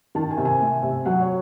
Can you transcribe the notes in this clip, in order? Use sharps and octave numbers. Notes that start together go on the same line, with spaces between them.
D#3 A5
G#5
C3
G#5
A3
C3
F#3 F#5
C#5